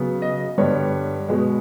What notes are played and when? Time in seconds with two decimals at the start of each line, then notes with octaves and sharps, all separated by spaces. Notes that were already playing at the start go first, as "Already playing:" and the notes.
Already playing: C#3 F#3 B3
0.22 D#5
0.58 G2 D3 G3 B3 C#5
1.28 B2 G#3 B3